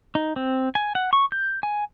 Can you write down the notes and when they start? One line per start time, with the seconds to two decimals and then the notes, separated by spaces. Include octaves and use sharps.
0.15 D#4
0.36 C4
0.75 G#5
0.95 F#5
1.13 C#6
1.32 G6
1.63 G#5